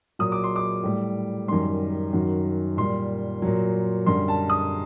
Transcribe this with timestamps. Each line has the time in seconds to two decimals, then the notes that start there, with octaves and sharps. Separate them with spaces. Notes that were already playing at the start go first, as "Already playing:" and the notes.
0.19 A#2 F#3 D#6
0.32 D6
0.44 C6
0.56 D6
0.83 A2 G3
1.48 F#2 D#3 G3 C6
2.13 F#2 D#3 F#3
2.77 A#2 G3 C6
3.42 A#2 F#3
4.06 F#2 D3 G3 C6
4.28 A5
4.50 D#6